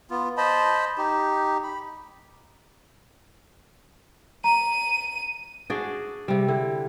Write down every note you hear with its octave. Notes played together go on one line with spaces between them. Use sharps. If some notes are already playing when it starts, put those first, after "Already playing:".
B3 F4
C5 D#5 A5 B5
D#4 G4
B5
A#5 D#7
D4 F#4 G#4 D5
C3 G3
D3 E4